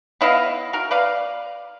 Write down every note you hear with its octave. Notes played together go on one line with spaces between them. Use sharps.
B3 E4 D#5 F5
F#4 A#4
B4 D5 F5